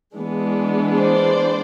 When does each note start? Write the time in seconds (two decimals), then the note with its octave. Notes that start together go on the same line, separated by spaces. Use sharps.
0.16 E3 G#3 B3 D4
0.96 C5 D5